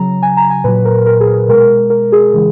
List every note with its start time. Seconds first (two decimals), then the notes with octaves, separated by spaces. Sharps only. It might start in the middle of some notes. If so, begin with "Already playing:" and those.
Already playing: C#3 F#3 A#5
0.22 G#5
0.37 A#5
0.50 G#5
0.64 A#2 F#3 B4
0.85 A#4
1.07 A#4
1.20 G#4
1.34 G#4
1.48 B2 G#3 A#4
1.90 A#4
2.12 G#4
2.33 C#3 E3 G#3